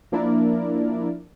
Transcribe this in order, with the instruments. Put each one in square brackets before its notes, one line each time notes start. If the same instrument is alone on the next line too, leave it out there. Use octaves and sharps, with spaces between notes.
[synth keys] F3 A#3 D4 E4 A#4 D5